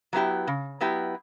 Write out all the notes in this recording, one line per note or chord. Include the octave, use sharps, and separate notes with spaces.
F#3 B3 E4 G4
C#3
F#3 B3 E4 G4